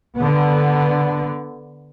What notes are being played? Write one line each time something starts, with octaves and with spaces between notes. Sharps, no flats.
D3 B3